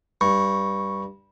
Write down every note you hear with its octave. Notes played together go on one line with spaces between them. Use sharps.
G2 C#6